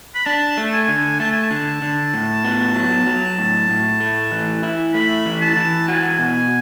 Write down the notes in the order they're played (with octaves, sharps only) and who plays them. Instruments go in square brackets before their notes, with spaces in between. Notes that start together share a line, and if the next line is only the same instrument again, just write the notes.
[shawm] B5
[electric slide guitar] D4 [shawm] A5
[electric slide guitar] A3
[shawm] G#5
[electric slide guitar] D3
[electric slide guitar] A3 [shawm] A5
[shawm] G#5
A5
[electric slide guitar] D3
D3
A2
B3
F#3
F#3
A2
A2
A3
E3
E4
[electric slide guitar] A3 [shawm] B5
[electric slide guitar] E3
[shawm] A5
[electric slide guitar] E3
[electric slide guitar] F#4 [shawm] G#5
[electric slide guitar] B2